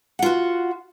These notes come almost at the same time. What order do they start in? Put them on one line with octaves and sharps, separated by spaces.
F#5 F4 F#4